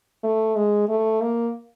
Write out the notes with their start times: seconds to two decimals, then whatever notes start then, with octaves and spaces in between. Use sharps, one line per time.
0.23 A3
0.56 G#3
0.89 A3
1.21 A#3